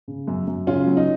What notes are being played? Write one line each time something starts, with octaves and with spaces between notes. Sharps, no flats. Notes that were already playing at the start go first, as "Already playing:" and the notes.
C#3
F#2
F#2
C#3 C#4 F4
F#3
D#4